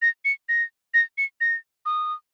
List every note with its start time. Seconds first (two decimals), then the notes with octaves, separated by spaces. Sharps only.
0.02 A#6
0.25 C#7
0.49 A#6
0.94 A#6
1.18 C#7
1.41 A#6
1.86 D#6